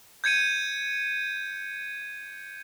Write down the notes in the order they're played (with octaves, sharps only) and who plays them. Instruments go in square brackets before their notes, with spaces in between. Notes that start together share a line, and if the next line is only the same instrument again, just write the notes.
[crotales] G6 G#6 C#7 D#7